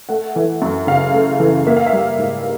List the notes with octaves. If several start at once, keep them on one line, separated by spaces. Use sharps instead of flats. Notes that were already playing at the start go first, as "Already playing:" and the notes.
A3 F#5
E3
F#2
C#3 F5
A3
E3
A#3 E5
F5
E5
G3
G#2